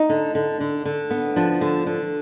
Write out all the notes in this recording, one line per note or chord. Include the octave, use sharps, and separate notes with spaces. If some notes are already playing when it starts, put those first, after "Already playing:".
Already playing: D#4
D3
D3
D3
D3
B3
F3 D4
D3
D3